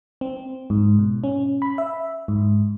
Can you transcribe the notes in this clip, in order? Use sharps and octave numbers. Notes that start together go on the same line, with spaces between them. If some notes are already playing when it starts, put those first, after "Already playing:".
C4
G#2
B2
C#4
B5
E5
G#2